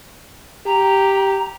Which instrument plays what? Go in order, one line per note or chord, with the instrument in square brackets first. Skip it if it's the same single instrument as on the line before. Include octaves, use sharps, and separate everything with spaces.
[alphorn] G4 [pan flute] A#5